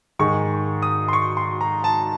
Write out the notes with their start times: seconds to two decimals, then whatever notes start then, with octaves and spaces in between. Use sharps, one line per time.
0.19 G#2 D#3 G#3 C#6
0.82 D#6
1.08 C6
1.13 C#6
1.37 C6
1.61 A#5
1.84 A5